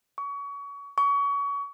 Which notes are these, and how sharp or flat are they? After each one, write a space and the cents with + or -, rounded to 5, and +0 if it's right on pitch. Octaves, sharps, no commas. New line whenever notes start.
C#6 +30
C#6 +30